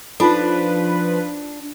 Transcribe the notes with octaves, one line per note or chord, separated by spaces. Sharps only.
F3 D4 D#4 F4 A4 B4